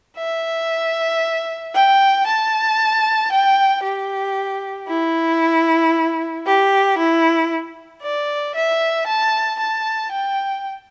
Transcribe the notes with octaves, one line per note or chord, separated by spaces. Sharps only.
E5
G5
A5
G5
G4
E4
G4
E4
D5
E5
A5
A5
G5